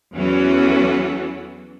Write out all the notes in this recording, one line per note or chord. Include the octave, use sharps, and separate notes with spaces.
E2 E3 F#3 C#4 F#4 A4